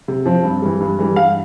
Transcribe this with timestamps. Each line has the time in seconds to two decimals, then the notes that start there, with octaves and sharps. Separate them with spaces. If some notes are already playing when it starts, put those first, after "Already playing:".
0.08 C3
0.26 F3 C4
0.44 G2
0.62 E3 G3
0.80 G2
0.99 E3 G3
1.16 G2 F5